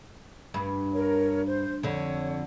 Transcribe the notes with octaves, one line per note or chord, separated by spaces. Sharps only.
G2
A#4 C#5
C5
F2 D3 C#5